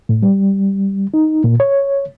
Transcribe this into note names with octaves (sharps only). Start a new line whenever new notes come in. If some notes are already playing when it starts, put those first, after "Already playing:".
A2
G3
D#4
A#2
C#5